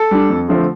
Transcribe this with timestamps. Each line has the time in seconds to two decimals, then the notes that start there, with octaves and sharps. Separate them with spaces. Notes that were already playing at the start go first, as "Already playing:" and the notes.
Already playing: A4
0.11 G3 D4
0.30 F2
0.48 D3 F3 A3 C4